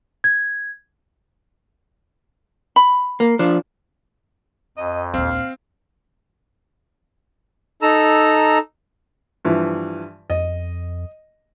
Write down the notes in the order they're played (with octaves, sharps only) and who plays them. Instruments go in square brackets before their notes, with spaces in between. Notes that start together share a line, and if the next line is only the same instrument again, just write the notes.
[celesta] G#6
[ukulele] B5
[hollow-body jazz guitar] A#3
F3 D4
[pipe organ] F2 [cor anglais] D#5
[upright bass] A#1 D#2 [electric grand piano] C4 [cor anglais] F5
[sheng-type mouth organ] D#4 A4 A#5 E6
[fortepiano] G2 E3 F3
[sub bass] F2 [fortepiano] D#5